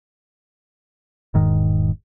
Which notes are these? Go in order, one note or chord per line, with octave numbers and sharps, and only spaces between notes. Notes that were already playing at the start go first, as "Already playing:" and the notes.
E1 G#2 D#3